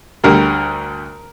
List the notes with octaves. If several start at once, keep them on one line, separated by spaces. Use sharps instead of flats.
D2 D3 G3 A#4